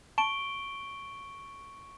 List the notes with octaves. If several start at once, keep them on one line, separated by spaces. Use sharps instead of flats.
A5 C#6 D7 G7